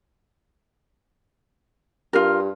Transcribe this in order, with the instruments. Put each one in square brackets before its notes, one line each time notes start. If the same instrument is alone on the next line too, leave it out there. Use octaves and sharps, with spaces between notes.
[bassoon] G2 [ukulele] F4 A#4